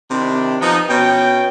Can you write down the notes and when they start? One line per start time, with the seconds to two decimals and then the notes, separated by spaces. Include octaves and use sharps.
0.10 C3 D#3 D4 E4
0.61 F3 B3 D#4
0.90 B2 C#4 G5